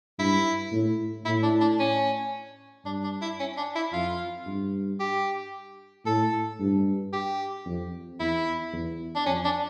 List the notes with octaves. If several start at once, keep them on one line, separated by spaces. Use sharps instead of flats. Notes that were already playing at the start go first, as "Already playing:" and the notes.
G2 E4
A2
A2 E4
D4
D4
C#4
G2 D4
D4
E4
C#4
D4
E4
F2 F4
G2
G4
A2 A4
G2
G4
F2
E2 E4
E2
D4
F2 C#4
D4